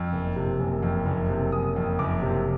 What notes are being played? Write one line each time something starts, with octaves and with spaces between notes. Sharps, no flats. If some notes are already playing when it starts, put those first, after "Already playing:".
Already playing: F2
F#1
C3
F#1
F2
F#1
C3
F#1 D#6
F2
F#1 D6
C3